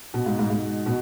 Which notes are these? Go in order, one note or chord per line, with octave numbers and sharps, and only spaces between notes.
B2
G#2
G#2
G#2
B2